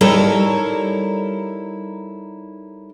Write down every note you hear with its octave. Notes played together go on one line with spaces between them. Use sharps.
G3 D#4 E4 A4 A#4 C#5